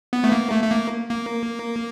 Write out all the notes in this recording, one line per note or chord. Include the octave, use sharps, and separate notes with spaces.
B3
A3
A#3
A3
A3
A#3
A#3